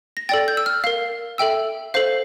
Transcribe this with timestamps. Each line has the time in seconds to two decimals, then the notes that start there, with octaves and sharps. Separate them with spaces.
0.17 A#6
0.29 A4 D5 G5 A6
0.48 G6
0.57 E6
0.66 F6
0.84 A#4 F5
1.38 A4 E5 G5 E6
1.94 A4 C5 F5